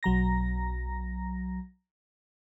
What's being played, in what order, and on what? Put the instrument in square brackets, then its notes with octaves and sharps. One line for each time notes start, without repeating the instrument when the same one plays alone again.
[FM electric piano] B1 F#3 A#5 A#6